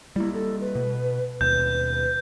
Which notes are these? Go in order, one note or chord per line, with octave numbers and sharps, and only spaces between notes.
G3 A#3 E4
A4
B4
B2
D#2 B2 B4 G6